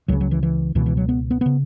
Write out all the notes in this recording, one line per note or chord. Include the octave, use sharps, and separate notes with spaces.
C#2 C#3 F#3
F#3
E3
E3
C#2 B2 E3
E3
F#3
B3
B3
C#3 B3